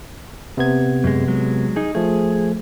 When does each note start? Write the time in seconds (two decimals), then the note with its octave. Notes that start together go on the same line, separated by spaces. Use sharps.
0.57 C3 B3 G#6
1.04 F#2 G#3
1.28 F#3 G#3
1.76 D#4 G#4
1.95 F3 A3 G#4